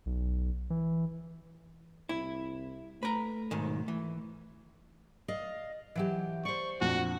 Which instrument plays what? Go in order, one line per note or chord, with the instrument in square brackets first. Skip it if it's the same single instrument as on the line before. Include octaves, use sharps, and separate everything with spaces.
[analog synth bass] B1
E3
[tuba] C2 [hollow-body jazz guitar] E4
[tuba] A3 [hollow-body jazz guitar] B4 A#5
[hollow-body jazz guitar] B1 G#2 D#3
[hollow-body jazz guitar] E3 [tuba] A3
[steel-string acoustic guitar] D5 D#5 F5
E3 F#3 G4
[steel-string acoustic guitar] C5 D5 [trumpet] C#6
[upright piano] A#1 F2 [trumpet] F#4